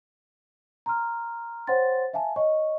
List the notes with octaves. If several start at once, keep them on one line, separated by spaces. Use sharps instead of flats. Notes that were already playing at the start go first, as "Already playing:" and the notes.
A#5 C6 F6
C5 C#5 F#5 G5 C6 A6
E5 F5 G#5 A5
C#5 D#5 C#6